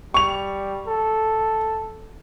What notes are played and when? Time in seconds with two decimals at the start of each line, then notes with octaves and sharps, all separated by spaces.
0.14 G3 C#6 F7
0.87 A4